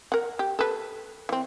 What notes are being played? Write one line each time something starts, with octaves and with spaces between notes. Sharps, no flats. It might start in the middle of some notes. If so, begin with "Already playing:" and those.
A#4 F#5
G4
A4 B4
E3 C4